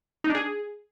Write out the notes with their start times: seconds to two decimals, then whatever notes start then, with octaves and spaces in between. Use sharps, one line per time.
0.24 D#4
0.29 D4
0.35 G#4